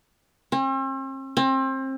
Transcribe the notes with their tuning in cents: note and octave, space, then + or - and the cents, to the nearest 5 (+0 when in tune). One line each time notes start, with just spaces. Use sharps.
C4 +45
C4 +30